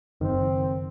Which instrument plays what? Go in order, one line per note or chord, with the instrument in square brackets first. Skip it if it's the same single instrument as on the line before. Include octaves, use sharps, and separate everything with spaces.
[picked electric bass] F#1 [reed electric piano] D#3 [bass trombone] C4